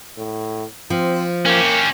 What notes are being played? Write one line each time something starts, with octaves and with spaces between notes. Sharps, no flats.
A2
F3 C4
A#3 C#4 G4